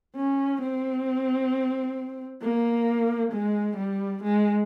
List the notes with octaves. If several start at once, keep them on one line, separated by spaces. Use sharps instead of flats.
C#4
C4
A#3
G#3
G3
G#3